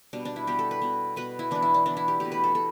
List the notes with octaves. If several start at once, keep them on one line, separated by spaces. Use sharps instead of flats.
B2 G3 B3 D4
D4
E4
B2 G3 B3 G4
A4
B4
B2 B3
B2 B3 B4
E4
E3 B3 D4
E4
D4
E3 B3 D4
E4
G4
B2 A3 G4
B4
A4
B2 A4